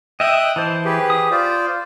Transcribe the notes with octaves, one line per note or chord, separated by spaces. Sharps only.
D#5 E5 G5 D#6 F#6
E3 C5 A5
G4 G#4 B4
D#6
F4 C5 D5